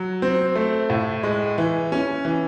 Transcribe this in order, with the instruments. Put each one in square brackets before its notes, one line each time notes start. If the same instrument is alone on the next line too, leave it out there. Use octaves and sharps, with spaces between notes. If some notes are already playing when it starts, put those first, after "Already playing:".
Already playing: [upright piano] F#3
C4
A3
A2
G#3
E3
C#4
E3